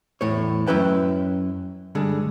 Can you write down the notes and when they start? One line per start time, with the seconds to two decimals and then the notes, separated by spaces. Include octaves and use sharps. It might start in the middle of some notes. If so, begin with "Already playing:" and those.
0.21 E2 A2 C#5
0.67 F#2 C#4 E4 B4 G5
1.95 G2 D3 G#3